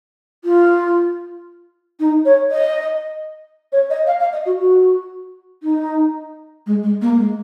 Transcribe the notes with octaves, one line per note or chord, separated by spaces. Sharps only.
F4
D#4
C#5
D#5
C#5
D#5
F5
F5
D#5
F#4
F#4
D#4
G#3
G#3
A#3
G#3